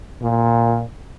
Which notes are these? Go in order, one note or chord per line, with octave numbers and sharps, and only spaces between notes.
A#2